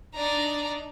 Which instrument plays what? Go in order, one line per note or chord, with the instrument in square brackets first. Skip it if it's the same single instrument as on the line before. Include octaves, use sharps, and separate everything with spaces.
[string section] D4 D#4 [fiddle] D5 A#5